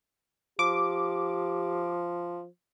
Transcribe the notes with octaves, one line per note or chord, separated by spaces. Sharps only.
F3 G4 D6